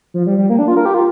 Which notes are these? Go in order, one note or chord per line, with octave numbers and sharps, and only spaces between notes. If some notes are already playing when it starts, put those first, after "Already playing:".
F3
G3
G3
A#3
D4
F4
A#4
G4
F4